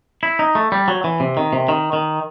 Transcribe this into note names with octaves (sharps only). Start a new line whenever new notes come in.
E4
D#4
A3
G3
F#3
E3
C3
D#3
C3
D#3
D#3